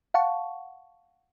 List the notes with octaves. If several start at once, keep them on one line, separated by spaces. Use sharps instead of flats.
F5 F#5 A5 C#6